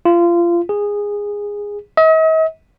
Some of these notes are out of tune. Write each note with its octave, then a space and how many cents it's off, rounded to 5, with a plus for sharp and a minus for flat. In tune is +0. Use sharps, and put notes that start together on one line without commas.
F4 -25
G#4 -15
D#5 +45